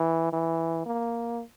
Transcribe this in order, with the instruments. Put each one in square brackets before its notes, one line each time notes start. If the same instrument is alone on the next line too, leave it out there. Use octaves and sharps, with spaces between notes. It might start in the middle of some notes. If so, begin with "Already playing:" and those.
Already playing: [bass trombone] E3
E3
A#3